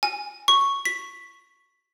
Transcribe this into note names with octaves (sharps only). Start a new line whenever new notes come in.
G#5
C#6
B6